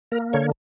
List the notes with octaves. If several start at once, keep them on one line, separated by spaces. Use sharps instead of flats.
A#3 A#4
D3 C#5